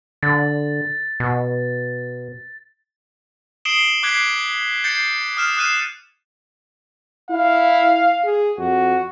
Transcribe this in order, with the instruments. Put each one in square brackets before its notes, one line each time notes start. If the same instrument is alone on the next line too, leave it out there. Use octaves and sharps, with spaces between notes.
[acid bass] D3 [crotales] A6
[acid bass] B2
[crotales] D#6 C7 D7 E7 F#7 G7
D6 F#6 G#6 B6 C7 D7
G6 A6 C7 C#7
D#6 F6 E7
D#6 F6 F#6 C7 D#7 E7
[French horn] E4 [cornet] F5
[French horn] G#4
[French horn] F2 [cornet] F#4